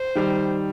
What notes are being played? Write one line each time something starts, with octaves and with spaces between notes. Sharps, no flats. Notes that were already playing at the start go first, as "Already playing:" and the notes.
Already playing: C5
D#3 G3